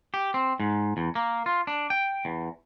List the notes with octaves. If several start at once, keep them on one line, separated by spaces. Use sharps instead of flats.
G4
C4
G#2
E2
A#3
F4
D4
G5
E2